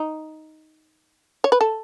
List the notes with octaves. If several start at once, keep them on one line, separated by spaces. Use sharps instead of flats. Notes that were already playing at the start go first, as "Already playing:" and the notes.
Already playing: D#4
C#5
B4
A4